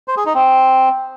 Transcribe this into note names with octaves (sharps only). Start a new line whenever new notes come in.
C5
G#4
D#4
C4